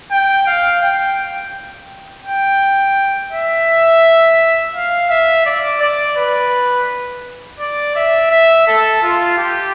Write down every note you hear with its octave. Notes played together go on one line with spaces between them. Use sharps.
G5
F5
G5
G5
E5
F5
E5
D5
D5
B4
D5
E5
E5
A4
F4
G4